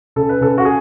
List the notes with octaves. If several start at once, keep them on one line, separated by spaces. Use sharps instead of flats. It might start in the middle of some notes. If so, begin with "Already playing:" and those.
C#3 A4
B4
C#3 A4
F#4
G#4